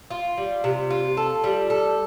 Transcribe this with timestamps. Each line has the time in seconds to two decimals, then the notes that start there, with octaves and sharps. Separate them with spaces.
0.10 F4
0.38 G3
0.64 C3
0.91 F4
1.17 A4
1.44 G3
1.70 A4